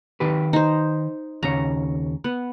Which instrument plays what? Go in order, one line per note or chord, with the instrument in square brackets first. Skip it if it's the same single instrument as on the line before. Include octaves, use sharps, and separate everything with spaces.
[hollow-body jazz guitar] D#3 G4 B4
[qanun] D#4 C5
[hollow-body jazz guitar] D#2 C#3 C#5 [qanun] A#5
[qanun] B3